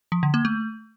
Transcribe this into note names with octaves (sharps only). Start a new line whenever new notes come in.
F3
D3
A#3
A3